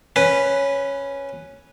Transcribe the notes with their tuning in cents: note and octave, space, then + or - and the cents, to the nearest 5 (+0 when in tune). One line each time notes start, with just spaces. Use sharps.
C#4 +0 B4 +0